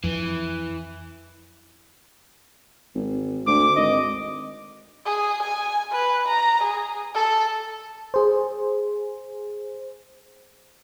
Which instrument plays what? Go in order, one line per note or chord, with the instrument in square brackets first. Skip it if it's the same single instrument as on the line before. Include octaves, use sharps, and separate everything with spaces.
[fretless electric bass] F2 [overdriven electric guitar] E3
[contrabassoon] G#1
[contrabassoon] D2 [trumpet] D6
[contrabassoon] G#1 [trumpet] D#5
[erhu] G#4
G#5
B4
A#5
G#4
A4
[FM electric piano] G#4 C5